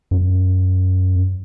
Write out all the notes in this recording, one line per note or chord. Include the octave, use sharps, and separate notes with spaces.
F#2